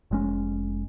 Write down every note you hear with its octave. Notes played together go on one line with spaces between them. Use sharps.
F1 G#3 C#4